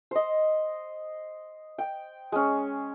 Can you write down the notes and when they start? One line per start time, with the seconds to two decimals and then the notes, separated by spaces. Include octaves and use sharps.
0.11 C5 D#5
1.78 G5
2.32 G#3 C#4